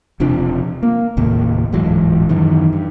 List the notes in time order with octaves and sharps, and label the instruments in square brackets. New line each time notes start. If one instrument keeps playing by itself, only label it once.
[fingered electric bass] E1 C3 F3 D4
A#3
F1 D#2 A2 A#3
D1 G#2 E3 F#3
F#2 D#3 E3
G2